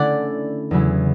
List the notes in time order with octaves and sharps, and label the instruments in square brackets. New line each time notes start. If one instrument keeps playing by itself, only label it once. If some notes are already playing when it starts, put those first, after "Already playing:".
Already playing: [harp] D3 A3 C#4 E4 [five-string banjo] D5 F#5
[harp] E2 C#3 F#3 C#4 E4